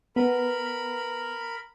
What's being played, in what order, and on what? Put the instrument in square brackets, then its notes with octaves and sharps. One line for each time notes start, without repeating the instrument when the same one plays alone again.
[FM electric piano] B3 [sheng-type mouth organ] A#4 B5